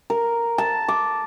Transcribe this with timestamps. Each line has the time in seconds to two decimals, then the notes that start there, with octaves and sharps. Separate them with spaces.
0.10 A#4
0.58 A5
0.88 D6